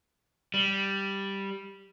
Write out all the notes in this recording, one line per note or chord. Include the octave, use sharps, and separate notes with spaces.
G3